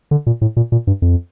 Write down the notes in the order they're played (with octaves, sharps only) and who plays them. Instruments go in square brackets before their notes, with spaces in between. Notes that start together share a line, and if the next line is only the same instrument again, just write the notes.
[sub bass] D3
A#2
A2
A#2
A#2
G2
F2